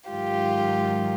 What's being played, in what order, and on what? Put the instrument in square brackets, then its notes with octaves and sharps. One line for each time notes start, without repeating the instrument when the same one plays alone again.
[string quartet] G#2 D#3 F#3 F4 G4